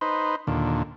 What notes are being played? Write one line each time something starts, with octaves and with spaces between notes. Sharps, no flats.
D#4 B4 C5
D#2 A#2 D3